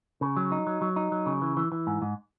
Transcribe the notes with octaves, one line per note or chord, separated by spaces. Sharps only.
C#3
F#3
D#4
F#3
F#3
D#4
F#3
C#3
E3
E3
E3
G#2
G#2